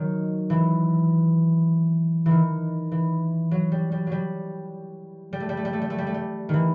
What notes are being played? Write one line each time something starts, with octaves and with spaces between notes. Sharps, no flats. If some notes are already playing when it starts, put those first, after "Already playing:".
Already playing: D#3 F#3
E3
D#3 E3
E3
F#3
G3
G3
F#3 G3
G3
A3
G3
A3
G3
A3
G3
A3
G3
A3
G3
D#3 E3